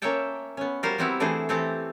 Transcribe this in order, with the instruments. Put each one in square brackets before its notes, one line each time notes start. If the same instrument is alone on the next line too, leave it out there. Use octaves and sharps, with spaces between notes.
[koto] A#3 C#4 C#5 E5 G5 A5
B3 C#4
G3 F4 F#4 A#4 C5
G3 B3 C4 E4 F#4 G4
E3 A3 D4 F#4 G#4 C5
E3 A3 C4 G4 A4